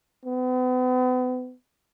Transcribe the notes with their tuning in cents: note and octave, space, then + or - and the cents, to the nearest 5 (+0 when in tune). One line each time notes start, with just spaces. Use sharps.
B3 +40